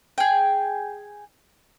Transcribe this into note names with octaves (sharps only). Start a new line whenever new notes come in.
G#4 G5